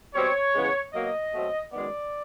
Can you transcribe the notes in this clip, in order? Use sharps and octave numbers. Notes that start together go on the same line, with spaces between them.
B2 G3 C4 C#5
C#3 E3 G#3 B3
B2 F#3 A#3 D#5
B2 F#3 A3 C4
F#2 D#3 G#3 B3 D5